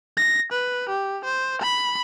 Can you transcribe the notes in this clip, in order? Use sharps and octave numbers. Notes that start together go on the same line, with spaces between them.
A#6
B4
G4
C5
B5